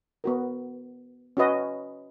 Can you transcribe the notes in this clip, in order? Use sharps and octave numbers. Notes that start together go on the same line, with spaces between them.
B3 F#4 A#4
C#4 F#4 B4 D#5